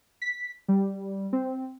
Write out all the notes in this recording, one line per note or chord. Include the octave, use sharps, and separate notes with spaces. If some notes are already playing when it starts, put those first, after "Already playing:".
B6
G3
C4